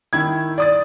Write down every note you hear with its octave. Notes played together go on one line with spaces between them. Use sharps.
D#3 E4 G#6
D5 D#6 A6